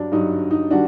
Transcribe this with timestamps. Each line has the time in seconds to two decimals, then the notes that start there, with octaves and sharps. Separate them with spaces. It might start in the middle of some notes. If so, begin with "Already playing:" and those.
Already playing: G2 F#3 D4
0.12 G2 F#3 D#4
0.51 D#4
0.71 D#3 G3 D4 F#4